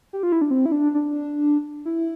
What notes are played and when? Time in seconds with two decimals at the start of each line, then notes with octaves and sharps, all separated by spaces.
0.13 G4
0.23 F4
0.32 E4
0.41 D4
0.51 C4
0.66 E4
0.72 D4
0.94 D4
1.85 E4